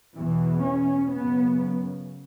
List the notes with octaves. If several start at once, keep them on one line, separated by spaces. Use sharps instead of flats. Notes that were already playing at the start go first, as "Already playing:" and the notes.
E2 B2 E3
C#4
F#2 C#3 B3